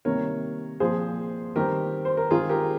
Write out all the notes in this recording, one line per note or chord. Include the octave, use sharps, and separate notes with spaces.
C3 D#3 G3 A#3 A#4 C#5
A#2 F3 C4 G#4 C5
D#3 G3 C4 G4 A#4
C5
A#4
D#3 G#3 C4 F4 G#4
G4 A#4